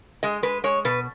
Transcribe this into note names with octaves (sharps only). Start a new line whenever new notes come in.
G#3 D#5
G#3 B4
G#3 C#5
B2 B4